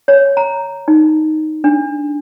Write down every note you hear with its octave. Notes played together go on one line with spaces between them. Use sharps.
C#5
A#5
D#4
D4